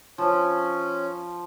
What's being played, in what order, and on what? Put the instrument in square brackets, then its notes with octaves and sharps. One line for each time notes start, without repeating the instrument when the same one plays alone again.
[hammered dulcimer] F3 [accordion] C#4